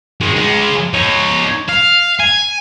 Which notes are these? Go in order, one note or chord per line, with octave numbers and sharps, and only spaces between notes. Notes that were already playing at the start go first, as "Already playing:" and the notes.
D#3 G#3
G#3 F4
D#4 C#5
F5
G#5